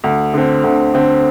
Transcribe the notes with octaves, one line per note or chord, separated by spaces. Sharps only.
D2
D3 C4
D2
D3 C4